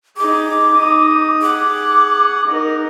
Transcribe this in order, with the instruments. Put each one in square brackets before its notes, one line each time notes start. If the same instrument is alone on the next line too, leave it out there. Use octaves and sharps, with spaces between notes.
[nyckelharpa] D#4 G#4 [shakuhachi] D6
[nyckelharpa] D#4 D#6
[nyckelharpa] G#4 F#5 [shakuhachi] D6
[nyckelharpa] D#4 A#4